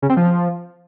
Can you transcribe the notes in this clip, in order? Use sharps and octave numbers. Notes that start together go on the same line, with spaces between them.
C#3
C4
F3